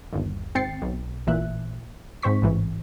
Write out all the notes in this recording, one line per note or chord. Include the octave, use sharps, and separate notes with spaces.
G1 D#2
G#1 C4 G5 A6 C7 C#7
B1
A1 A#2 E3 E5 F#6
G#2 C4 C5 C#6 B6
A1 G#2 E3